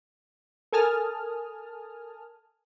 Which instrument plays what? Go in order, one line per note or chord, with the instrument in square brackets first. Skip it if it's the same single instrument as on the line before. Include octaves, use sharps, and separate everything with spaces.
[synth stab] A4 A#4 G#5 A5 D#6 F6